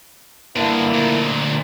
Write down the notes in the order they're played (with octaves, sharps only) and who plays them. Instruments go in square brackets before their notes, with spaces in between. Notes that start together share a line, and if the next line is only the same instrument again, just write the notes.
[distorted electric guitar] G2 D3 [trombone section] A#3 E4
[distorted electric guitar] D2 A#2